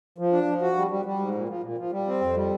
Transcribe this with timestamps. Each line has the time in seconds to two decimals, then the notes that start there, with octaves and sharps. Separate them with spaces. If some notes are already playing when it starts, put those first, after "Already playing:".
0.18 F3
0.33 D4
0.47 F3
0.62 F#4
0.76 G3
0.91 G3
1.05 G3
1.20 G#2
1.35 A#2
1.49 F3
1.63 A#2
1.78 F3
1.92 G3
2.07 C4
2.21 F2
2.36 G3